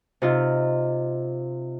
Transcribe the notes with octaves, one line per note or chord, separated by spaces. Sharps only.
C3 D#4 F4